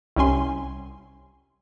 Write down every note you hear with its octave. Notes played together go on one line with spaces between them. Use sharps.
C2 G3 C#4 G#5 C6